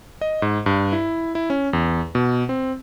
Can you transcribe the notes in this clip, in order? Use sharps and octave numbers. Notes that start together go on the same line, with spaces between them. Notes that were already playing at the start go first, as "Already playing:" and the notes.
D#5
G#2
G2
E4
E4
C#4
E2
B2
C4